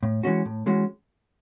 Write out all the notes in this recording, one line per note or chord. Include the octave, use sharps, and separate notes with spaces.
A2
E3 G#3 C#4 F#4
A2
E3 G#3 C#4 F#4